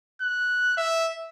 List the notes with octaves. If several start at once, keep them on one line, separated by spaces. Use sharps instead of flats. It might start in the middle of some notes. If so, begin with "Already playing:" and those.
F#6
E5